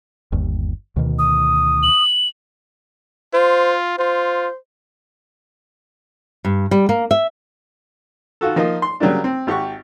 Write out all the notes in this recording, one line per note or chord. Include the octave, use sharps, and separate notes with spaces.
G1 D#2
D2 B2 D#3
D#6
F#7
F4 C5
F4 C5
G2
G3
A#3
E5
D#3 F4 F#4 A4
F3 A#3 D#4 F4 D#5
C6
C#3 F#3 G3 A#3 D4
C4
G#1 G4 F#5 C#6